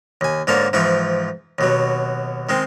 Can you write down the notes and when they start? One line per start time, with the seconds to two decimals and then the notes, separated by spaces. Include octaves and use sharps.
0.21 D#2 G#5
0.47 G#2 D3 A#3 C#5 A5
0.73 G#2 E3 F3 E4 C#6
1.59 D#2 B2 F#3
2.49 D#3 G#3 C4